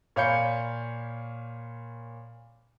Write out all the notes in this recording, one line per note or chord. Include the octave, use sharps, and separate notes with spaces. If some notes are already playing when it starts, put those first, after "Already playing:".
A#2 C#5 F5 B5 G6 C#7